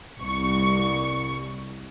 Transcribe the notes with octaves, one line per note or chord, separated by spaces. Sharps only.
C2 C#6